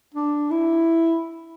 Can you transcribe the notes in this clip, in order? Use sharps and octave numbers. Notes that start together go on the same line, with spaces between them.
D4
E4